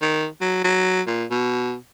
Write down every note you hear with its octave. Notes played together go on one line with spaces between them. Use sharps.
D#3
F#3
F#3
A#2
B2